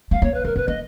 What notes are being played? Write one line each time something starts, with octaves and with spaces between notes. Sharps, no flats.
A3 F5
A#3 C#5
B4
A3 A#4
B3 B4
A#3 D#5